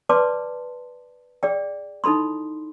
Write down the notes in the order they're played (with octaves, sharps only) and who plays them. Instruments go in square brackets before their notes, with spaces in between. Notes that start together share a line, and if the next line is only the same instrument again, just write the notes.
[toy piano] B4 D5 G#5 A5 C6 D6
G#4 D5 G5
D#4 E4 A4 B5 C6